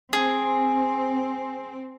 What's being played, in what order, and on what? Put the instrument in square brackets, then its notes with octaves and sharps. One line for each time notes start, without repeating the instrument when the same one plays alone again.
[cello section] C4 [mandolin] G#4